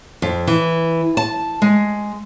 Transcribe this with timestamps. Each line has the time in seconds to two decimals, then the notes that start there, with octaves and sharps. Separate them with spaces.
0.22 F2
0.47 E3
1.17 A5
1.62 G#3